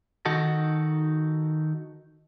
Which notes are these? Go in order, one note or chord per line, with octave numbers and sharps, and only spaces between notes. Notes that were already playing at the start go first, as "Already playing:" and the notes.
D#3 D#4 F#4 A4